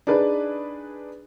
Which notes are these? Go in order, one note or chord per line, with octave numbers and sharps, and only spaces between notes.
D4 D#4 G#4 B4